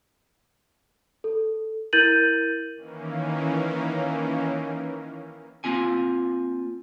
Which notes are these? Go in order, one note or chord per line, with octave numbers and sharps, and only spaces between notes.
A4
E4 A#4 G6 A6 D#7 F#7
D#3 E3 A#3 C#4
A#3 C4 F4 G#5